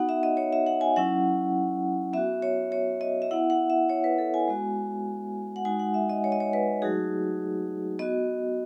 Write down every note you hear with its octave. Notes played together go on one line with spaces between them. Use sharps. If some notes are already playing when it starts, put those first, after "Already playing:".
Already playing: B3 D#4 F#4 F#5
E5
D#5
C#5
E5
F#5
G#5
F#3 C#4 E4 F#5
B3 F#4 E5
C#5
C#5
D#5
E5
B3 E4 F#5
F#5
E5
C#5
B4
A4
G#5
G#3 B3 F#4
F#5
G#3 D#4 F#4 G#5
F#5
E5
D#5
C#5
D#5
C#5
B4
F#3 A3 D#4 F#4 G#4
B3 F#4 D#5